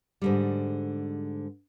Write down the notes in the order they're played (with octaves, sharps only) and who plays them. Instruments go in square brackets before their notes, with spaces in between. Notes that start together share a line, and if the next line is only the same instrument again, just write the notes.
[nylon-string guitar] G#2 D3 G3